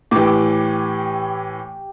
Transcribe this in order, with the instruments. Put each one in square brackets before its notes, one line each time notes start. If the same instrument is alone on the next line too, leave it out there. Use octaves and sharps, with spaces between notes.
[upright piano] A2 E3 [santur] G4 D6